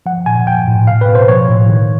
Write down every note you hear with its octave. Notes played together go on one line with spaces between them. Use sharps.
F3 F#5
A#2 G#5
F3 G5
A2
B2 F5
B4
B2
C5
F3 C#5
A2
D#3